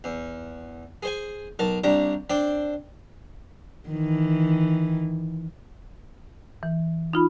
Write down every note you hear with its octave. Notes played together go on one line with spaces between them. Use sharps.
E2
G#4 C5 G#5
B1 A#4 A5
C2 D4 G4 A#5
C4 D4 D5 G5
D#3 E3
E3
D#4 F4 B5